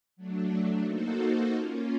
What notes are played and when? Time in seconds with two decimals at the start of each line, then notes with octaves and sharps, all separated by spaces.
0.16 F#3 A3 D4
0.85 A#3 D#4 F#4 A4 C5
1.54 A#3 C#4 F4